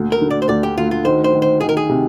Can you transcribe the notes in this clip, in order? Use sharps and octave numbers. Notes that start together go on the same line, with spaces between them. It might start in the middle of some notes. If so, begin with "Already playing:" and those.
Already playing: D2 A#2
A#4
D3
D5
C5
D2 D5
G4
D2 F4
F4
D#3 C5
C5
D#3
C5
D#3 G#4
A#4
G#4
C3